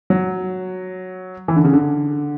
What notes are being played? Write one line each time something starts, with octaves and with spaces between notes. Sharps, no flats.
F#3
E3
D3
C#3
D3